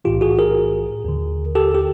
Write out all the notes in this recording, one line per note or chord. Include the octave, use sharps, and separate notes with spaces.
B1 A2 E3 F4 G4
F#4 G#4
G#4 A#4
D#2 D3
G4 A4
G4